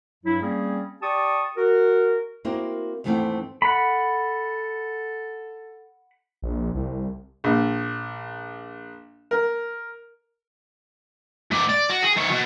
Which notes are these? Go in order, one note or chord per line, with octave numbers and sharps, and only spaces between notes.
G2 F#3 E4
G3 A#3 C4 C#4 G#4
G4 D5 A5 C#6 D#6
F#4 A#4
A#3 C4 E4 F#4 A#4 C5
D#2 G#2 E3 A3 B3 C4
A4 F#5 B5
A#1
C2
A#1
A#4
G#2 D5
D5
F#4
G#4
G#2 C#5
B2